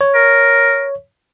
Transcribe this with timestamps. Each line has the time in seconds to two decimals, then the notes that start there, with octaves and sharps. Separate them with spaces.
0.01 C#5
0.15 A#4